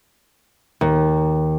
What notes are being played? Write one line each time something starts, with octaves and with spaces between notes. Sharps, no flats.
D#2